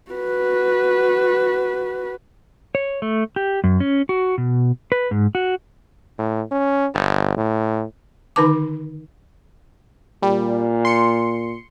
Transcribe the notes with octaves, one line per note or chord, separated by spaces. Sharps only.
F#4 B4
C#5
A3
G4
F#2
C#4
F#4
B2
B4
G#2
F#4
A2
C#4
G1
A2
D3 D#3 D#4 B4 A5 D6
A#2 G3
C6 C#7